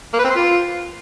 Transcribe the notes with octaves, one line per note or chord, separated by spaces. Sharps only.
A#3
B4
C4
C5
F4